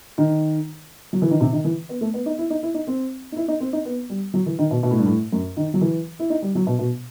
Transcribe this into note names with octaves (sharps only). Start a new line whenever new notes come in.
D#3
F#3
E3
D#3
C3
D#3
E3
B3
A3
B3
D#4
E4
D#4
E4
D#4
C4
D#4
E4
D#4
C4
D#4
B3
G3
F#3
E3
D#3
B2
B2
A2
G2
A2
F#2
D#3
F#3
E3
E4
D#4
G3
F#3
B2
B2